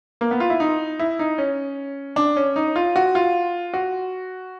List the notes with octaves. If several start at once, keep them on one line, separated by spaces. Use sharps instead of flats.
A#3
B3
F4
E4
D#4
E4
D#4
C#4
D4
C#4
D#4
F4
F#4
F4
F#4